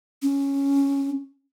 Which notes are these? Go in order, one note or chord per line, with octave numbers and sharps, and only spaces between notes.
C#4